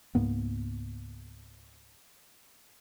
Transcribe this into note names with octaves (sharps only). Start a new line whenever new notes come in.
C#2 G#2 A#3 B3